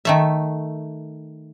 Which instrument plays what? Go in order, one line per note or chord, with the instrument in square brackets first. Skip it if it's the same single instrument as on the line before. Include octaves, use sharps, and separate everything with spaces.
[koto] D#3 A3 E5